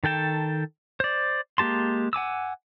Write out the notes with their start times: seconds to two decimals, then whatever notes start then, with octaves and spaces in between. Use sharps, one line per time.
0.04 D#3 A4 G5 A5
1.00 C5 D5
1.58 G#3 A#3 G4 A5 C6
2.13 F#5 G#5 D6 E6